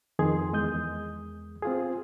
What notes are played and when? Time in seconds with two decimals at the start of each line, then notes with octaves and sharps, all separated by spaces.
0.19 F2 D#3 G#4 C6
0.53 E2 G#3 D#6 G6
1.62 C4 F4 G#4